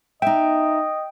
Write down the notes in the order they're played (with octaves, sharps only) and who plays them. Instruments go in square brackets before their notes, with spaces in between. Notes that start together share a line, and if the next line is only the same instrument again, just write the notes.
[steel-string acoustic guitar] D#4 E5 [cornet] D#5 [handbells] G5